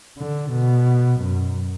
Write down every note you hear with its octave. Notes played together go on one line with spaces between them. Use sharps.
D3
B2
F#2